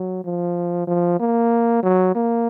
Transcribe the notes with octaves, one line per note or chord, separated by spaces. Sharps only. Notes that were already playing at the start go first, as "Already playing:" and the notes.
Already playing: F#3
F3
F3
A#3
F#3
A#3